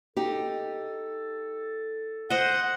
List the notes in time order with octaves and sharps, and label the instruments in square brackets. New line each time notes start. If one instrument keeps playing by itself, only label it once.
[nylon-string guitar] D#4 G4 [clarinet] A4
[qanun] C5 D#5 [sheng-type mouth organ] F#5